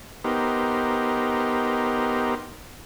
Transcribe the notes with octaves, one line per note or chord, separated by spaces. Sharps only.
B3 D#4 G4 A#4 C5